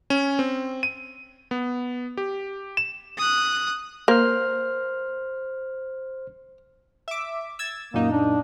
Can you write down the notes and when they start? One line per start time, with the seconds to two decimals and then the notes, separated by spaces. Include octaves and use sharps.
0.10 C#4
0.39 C4
0.83 D#7
1.51 B3
2.17 G4
2.77 E7
3.18 D#6 F#6
4.08 A#3 C5 F6
7.08 E5 D6
7.59 E6 G#6 A6
7.94 F#2 A#2 A#3 D#4
8.11 D4